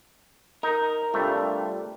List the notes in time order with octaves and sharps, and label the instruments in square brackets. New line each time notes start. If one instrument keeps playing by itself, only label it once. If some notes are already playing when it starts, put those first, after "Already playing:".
[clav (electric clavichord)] D#4 [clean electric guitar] A#4
[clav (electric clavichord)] C3 A3 [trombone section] G3 D4 F4